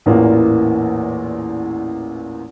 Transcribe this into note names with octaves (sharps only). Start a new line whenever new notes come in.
A1 E2 A#2 E3 A#3